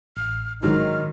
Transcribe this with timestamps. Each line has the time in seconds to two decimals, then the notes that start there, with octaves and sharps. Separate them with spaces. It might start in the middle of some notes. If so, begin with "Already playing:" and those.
0.17 A1 F6
0.63 G#2 D#3 F#3 F6